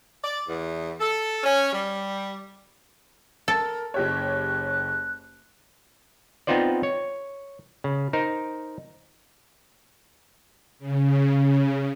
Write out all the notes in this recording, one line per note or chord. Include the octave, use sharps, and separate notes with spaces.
D5
E2
A4
C#4
G3
A4 A#4
F#1 G4 C#5 F#6
B3 C4 D#4 F4 C5 D5
C#5
C#3
D#4 A#4 C5
C#3